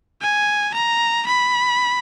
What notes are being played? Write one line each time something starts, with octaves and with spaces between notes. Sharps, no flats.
G#5
A#5
B5